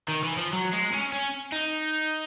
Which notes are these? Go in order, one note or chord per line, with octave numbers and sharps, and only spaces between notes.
D#3
E3
F3
F#3
G#3
C#4
C#4
D#4